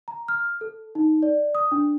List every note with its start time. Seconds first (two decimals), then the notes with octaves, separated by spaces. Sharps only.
0.08 A#5
0.28 F6
0.61 A4
0.95 D#4
1.23 D5
1.55 D#6
1.72 D4